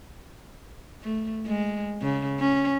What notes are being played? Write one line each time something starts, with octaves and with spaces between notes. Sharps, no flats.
A3
G#3
C#3
C#4